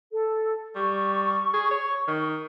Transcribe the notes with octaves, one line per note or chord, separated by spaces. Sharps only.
A4
G3 C#6
G#4
C#5
D#3